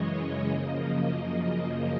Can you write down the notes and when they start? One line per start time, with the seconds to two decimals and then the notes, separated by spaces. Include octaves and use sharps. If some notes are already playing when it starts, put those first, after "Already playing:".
Already playing: F#2 C#3 E3 G#3 C#5 D#5
0.15 C#5
0.48 F#2 C#3 F3 A#3 D#5
0.81 D#5